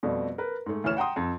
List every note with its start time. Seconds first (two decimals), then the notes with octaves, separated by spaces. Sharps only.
0.03 F2 B2 G3 A3
0.38 A#4 B4
0.66 G#2 A3
0.84 D2 E3 C#5 F6 E7
0.97 F#5 G5 A#5 C6 D#6
1.16 F2